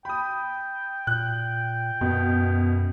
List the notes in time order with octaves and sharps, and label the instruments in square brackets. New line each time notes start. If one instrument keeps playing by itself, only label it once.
[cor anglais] G5 [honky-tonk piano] B5 D#6
[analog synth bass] A#2 [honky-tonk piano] F#6
[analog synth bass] F#2 [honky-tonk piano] B2